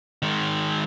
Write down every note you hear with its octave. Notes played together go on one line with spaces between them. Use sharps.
D#3 G#3